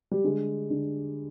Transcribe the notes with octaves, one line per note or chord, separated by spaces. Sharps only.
G3
D3 G#3
D3